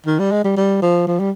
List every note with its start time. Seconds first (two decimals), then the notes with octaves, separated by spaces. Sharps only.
0.07 D#3
0.19 G3
0.32 G#3
0.44 G3
0.57 G3
0.82 F3
1.07 F3
1.19 G3